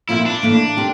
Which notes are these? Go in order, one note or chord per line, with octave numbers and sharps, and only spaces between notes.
A#2 F3 C4 E4 F4
D4
A2 E3 A#3
C4 G4 A#4